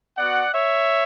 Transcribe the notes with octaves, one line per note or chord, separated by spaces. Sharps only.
B3 F#4 D5 F#5
C#5 E5